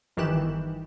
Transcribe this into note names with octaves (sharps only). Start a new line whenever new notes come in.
G1 D#3 E3 G4 F#6 E7